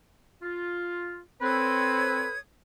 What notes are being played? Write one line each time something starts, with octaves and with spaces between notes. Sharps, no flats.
F4
C4 A4 B4 C#5 D#6 G#6